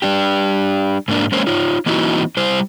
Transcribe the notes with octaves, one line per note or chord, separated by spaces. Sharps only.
G3 D4 G4
G#2 A#3 D4
G#3 A#3 C#4 C5
D#4 F4 C#5
E3 A#3 C4 D#4 E4 F#4
G3 E4 C5